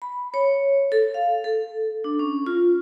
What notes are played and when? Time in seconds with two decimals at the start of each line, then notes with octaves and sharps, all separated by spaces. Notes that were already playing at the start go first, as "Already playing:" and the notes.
0.02 B5
0.34 C#5
0.92 A4
1.14 F5
1.44 A4
2.04 D4
2.19 C#4
2.46 F4